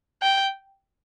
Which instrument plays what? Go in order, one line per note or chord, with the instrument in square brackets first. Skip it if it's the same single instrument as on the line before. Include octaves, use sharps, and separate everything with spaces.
[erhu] G5